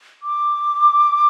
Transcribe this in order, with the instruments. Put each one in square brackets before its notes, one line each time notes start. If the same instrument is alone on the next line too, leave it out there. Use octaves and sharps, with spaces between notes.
[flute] D6